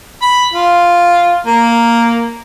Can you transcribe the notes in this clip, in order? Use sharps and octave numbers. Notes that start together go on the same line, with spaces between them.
B5
F4
A#3